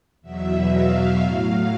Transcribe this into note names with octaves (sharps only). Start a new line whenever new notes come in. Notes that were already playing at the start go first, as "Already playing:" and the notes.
E2 B2 F#3 E5
F5
A2 F#3 F5